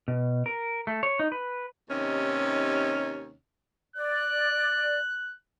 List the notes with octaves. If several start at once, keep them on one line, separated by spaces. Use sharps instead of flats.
B2
A#4
A3
C#5
D#4
B4
D#2 C3 C#4 D#4
D5 F#6